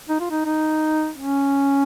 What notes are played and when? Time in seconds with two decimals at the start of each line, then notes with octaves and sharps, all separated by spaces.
0.09 D#4
0.21 F4
0.30 D#4
0.45 D#4
1.18 C#4